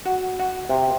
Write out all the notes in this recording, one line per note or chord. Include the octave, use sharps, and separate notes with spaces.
F#4
F#4
C3